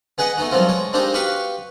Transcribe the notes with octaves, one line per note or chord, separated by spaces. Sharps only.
B3 G#4 B4 D#5 F#5
A3 B3 D#4 F#4
G2 F3 F#3 A#3 C4 F4
G#3 C#5
G#3 A#3 C4 D4 D#4 G4
F#4 G4 B4 F5 B5 C#6